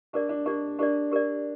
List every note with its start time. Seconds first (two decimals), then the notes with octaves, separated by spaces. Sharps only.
0.13 D4 G4 A#4 D5
0.29 D4
0.46 D4 G4 A#4 D5
0.79 D4 G4 A#4 D5
1.12 G4 A#4 D5